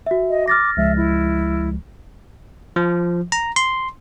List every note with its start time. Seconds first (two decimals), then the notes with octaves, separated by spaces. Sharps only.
0.06 F#4 E5
0.29 D#5
0.48 D6 F6 A6 A#6
0.77 C#2 F3 G#3 E5
0.96 E4
2.76 F3
3.32 A#5
3.56 C6